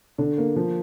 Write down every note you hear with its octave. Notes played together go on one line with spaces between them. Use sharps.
D3
A#3
F3